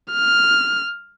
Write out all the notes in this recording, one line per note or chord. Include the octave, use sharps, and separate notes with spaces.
F6